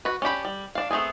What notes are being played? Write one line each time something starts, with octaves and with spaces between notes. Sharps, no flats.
F#4 B4
C#4 D4 G4 B5
G3
D4 F5
A3 B3 C4 G#4